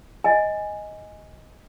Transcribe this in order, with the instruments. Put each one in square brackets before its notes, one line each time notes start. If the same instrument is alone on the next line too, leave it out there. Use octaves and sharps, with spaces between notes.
[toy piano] D#5 G#5